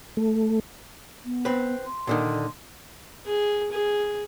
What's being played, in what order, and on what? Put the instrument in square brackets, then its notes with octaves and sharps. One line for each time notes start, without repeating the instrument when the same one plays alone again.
[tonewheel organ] A3
[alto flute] B3
[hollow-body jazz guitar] C4 B4
[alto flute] C6
[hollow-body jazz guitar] A#2 D3 D#3
[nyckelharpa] G#4
G#4